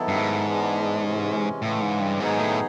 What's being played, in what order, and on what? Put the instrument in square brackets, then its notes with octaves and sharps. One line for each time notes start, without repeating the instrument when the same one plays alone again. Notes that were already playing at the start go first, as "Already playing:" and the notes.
Already playing: [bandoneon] D#3 F#3 B3 E4 A4
[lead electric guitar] G2
G#2
[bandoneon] E3 G#3 B3 D4
C3 E3 G#3 C#4
[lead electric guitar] A2 [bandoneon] C#3 E3 G#3
[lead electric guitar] G#2
G2
[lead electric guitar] G#2 [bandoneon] D#3 F#3 B3 D#4 G#4
[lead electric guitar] A2